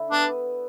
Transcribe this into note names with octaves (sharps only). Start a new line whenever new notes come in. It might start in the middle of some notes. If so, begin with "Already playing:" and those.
Already playing: D3 E4
B3 D4